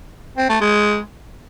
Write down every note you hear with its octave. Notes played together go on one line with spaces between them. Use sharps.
C4
A3
G#3